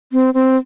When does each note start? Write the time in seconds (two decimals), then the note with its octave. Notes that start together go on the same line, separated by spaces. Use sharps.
0.13 C4
0.34 C4